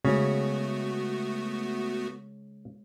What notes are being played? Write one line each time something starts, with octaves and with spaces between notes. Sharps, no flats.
C#3 G#3 A3 B3 F#4 C#5